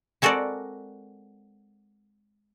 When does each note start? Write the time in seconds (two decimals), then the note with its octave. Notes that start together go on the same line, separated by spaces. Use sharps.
0.22 G#3 C4 F#4 A4 A#4 D5